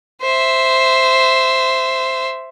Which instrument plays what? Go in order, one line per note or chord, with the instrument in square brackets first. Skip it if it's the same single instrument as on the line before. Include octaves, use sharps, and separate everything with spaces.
[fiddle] C5 E5